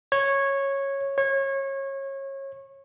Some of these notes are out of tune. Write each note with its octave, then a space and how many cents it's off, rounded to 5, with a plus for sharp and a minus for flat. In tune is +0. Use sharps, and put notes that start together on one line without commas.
C#5 -10
C#5 -25